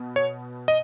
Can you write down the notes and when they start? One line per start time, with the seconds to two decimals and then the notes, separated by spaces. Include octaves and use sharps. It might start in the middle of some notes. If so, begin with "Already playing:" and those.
Already playing: B2 B3
0.16 C#5
0.68 D#5